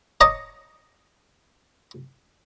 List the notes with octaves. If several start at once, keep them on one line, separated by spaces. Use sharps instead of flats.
C#5 D#5 A5 A#5 D6 D#6